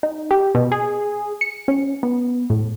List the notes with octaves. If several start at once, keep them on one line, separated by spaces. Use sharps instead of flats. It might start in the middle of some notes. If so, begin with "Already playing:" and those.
D#4
G4
B2
G#4
C#7
C#4
B3
A2